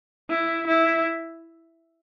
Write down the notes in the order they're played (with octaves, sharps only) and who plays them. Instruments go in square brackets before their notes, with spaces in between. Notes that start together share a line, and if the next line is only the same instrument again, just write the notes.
[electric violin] E4
E4